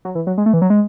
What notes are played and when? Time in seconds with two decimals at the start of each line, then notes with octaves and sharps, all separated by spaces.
0.05 F#3
0.15 E3
0.27 F#3
0.38 G#3
0.46 A3
0.54 E3
0.62 F#3
0.70 G#3